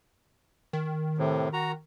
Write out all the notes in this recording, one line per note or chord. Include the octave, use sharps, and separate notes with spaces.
D#3
A2 C3
F#4 A#5